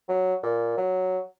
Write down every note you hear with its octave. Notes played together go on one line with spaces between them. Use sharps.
F#3
A#2
F#3